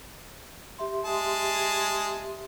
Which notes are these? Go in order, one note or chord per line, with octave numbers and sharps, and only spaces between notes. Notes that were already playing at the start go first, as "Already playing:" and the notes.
G4 E5 C6
G#3 G#4 A5